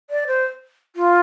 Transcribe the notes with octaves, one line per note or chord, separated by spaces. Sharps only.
D5
C5
F4